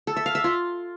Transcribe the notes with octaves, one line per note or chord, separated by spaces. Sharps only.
A4
E5
F5
E5
F4